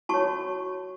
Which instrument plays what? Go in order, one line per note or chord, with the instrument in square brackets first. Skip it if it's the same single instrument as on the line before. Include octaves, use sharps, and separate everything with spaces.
[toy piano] F#4 C#5 A5 C#6